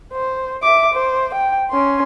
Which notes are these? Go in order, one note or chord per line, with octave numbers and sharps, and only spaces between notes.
C5
E5 D6
C5
G5
C#4 C6